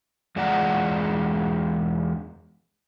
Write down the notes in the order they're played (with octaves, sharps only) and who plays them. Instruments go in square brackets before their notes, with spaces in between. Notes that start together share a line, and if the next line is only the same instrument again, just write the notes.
[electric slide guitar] E2 G#3 F4 D5 F#5 A#5